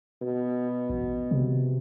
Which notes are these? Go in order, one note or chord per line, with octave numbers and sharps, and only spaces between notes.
B2
A1
C3